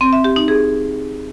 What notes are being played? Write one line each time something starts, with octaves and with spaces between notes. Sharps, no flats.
C4
E5
G4
D#4
G#4